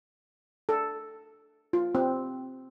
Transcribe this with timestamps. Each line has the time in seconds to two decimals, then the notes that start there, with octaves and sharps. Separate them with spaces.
0.69 A4
1.73 F4
1.95 C4